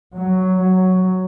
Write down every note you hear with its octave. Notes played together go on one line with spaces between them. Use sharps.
F#3
F#3